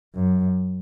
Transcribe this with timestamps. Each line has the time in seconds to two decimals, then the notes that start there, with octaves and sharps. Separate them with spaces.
0.15 F#2